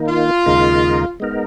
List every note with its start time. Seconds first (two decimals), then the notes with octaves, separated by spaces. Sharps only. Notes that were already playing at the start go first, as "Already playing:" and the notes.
Already playing: D#3 A#3 D#4
0.08 F4
0.46 D#2 C#3 G#3 D#4 A#4
1.20 G#3 B3 D#4 A#4